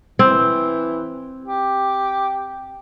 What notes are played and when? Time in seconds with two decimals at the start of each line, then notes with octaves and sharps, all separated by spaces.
0.19 E3 C4
1.44 G4